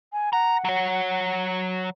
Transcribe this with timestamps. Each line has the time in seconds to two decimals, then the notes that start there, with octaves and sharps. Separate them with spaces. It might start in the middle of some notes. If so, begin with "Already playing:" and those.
0.12 G#5
0.33 F#5 A#5
0.65 F#3 C#5